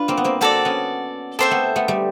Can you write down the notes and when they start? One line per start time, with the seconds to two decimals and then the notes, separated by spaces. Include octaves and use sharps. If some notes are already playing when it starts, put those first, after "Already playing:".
Already playing: D4 F4 B4
0.08 A#3 C4
0.17 B3
0.24 A#3 C4
0.41 A#3 C4 F#4 A4 D5
0.65 B3 C#4
1.39 A#3 C4 A4 C5 E5 G5
1.51 A3 B3
1.76 A3 B3
1.88 G3 A3